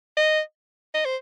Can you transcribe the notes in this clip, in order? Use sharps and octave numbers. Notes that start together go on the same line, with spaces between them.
D#5
D#5
C5